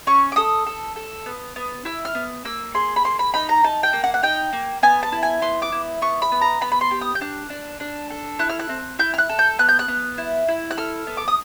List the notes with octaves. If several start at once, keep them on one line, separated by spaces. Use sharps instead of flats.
C#4 C#6
D6
A4 D#6
A4
A4
B3
B3
E4 E6
F6
B3
A#3 E6
G#4 C6
B5
A#3 C6
B5
D#4 B5
A#5
D#4 A5
G5
A#3
F#5
F#5
D#4 G5
A#3
B3 G#5
A5
E4
G#5
B3 C6
D6
E4
B3 C#6
B5
B3
A#5
B3 B5
B5
C6
G4
D#6
G6
D4 F#6
D4
D4
A4
E4 F#6
F6
F#6
C4
E4 G6
F6
F#6
A4
G6
B3 F#6
G6
F#6
B3
E4
E4
F#6
A4 F6
B3
D6
D#6